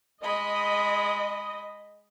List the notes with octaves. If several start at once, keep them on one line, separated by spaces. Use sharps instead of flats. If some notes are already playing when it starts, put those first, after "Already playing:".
G#3 D#5 B5